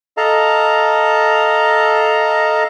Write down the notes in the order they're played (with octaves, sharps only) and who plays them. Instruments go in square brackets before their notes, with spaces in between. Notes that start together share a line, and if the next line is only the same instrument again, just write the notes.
[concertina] A4 D#5 F5 A5 A#5